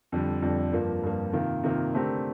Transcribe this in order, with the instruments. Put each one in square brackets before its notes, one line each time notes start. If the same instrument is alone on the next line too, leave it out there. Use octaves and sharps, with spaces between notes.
[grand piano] F2 D3 G3
F2 D3 G3
G2 F3 A#3
G2 F3 A#3
C3 D#3 A#3 F4
C3 D#3 A#3 F4
D3 A3 C4 G4 A#4